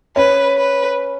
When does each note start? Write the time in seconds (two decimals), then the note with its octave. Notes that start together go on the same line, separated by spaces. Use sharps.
0.16 C#4 B4
0.57 B4